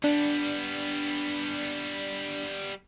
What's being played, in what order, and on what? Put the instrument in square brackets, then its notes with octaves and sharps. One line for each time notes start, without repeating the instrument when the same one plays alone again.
[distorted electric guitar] G3 B3 [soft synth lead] D4